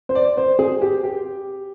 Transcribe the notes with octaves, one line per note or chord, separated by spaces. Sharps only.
C5
D5
C5
G#4
G4
G4